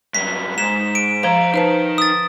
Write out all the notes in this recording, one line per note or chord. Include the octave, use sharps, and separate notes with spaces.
G2 F#3 B6
G#2 B6 E7
D7
F3 C5 F5 A#5
D#3 D#4 B4 C5 A5
D#6 A6